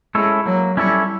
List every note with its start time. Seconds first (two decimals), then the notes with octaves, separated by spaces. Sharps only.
0.14 G#3 C#4 E4 A4 C#5
0.46 F#3 A#3
0.77 G3 C#4 E4 A4 C#5